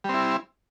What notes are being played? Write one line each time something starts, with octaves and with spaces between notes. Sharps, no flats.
G3 C4 E4